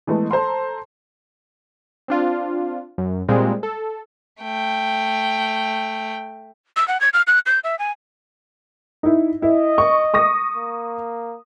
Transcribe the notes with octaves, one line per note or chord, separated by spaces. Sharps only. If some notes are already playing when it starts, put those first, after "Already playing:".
E3 G#3 A3 B3
A4 C5 A#5 C6
C4 D4 F4
F#2
A#2 G3 G#3 C4
A4
A3 G5
E6
F#5
G#6
F6
F#6
G6
E5
G#5
D#4 E4
E4 D#5
C#6
C#6 D#6 A#6
A#3